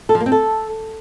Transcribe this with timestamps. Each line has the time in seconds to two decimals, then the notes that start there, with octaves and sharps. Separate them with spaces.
0.09 A4
0.15 F3
0.20 A#3
0.26 C4
0.32 A4